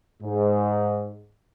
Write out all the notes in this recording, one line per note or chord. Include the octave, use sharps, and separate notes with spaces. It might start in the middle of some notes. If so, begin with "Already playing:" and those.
G#2